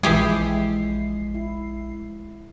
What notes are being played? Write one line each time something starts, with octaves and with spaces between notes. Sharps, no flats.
A#1 E3 F3 G#3 E4 G4 G#4 C7
E4